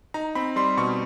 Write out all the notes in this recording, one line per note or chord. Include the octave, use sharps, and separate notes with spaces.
D#4 A#5
C4 B5
G3 C6
B2 C#6